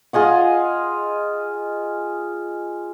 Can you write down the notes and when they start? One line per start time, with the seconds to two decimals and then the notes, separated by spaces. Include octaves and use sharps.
0.13 F4 G#4 D#5 F#5